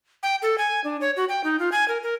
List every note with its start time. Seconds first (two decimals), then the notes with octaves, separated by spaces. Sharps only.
0.23 G5
0.42 A4
0.58 G#5
0.84 D4
1.01 C#5
1.16 F#4
1.29 G5
1.44 D#4
1.59 F4
1.72 G#5
1.88 A#4
2.03 A#4